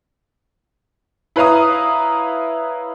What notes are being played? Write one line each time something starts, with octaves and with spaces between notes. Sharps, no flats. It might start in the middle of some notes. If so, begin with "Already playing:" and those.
E4 B4 C#5 F5 A#5 D#6